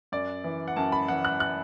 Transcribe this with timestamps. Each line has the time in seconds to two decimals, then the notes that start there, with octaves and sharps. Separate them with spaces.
0.12 F#2 D5
0.44 E3
0.68 F#5
0.76 F#2 A5
0.92 B5
1.08 E3 F#5
1.25 F#6
1.40 F#6